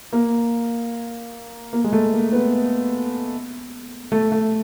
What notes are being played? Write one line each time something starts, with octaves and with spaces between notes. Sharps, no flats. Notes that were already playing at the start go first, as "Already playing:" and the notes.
A#3
A#3
G#3
A3
A#3
B3
A3
A3